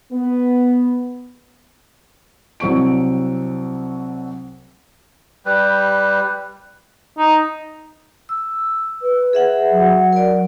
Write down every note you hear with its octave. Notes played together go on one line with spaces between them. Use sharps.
B3
C2 F#3 C4 C#6 D7
G3 B4
D#4
E6
B4
G#4 E5 F#5
F#3
A#4 D5